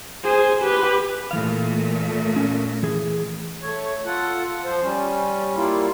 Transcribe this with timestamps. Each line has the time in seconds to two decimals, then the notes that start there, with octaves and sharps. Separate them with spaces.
0.23 G#4 C5
0.62 G4 B4
1.31 A#2 E3 A3 F5
2.36 C#4
2.83 E3 G#4
3.62 A3 C#5
4.05 F4 A4 F#5
4.65 F3 C5
4.83 G3 C#4
5.56 G3 A#3 E4 F4